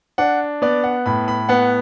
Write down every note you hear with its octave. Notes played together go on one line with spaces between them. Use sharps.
D4 F#5
B3 D5
F#5
A2 B5
B5
B3 F#5